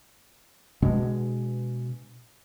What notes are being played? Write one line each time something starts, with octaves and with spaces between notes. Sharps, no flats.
B2 G#3 D4